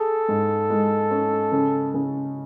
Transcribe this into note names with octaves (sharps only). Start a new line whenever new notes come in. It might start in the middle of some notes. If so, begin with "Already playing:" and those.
Already playing: G#4 A4
G#2
G#3
C#4
C#3
C#3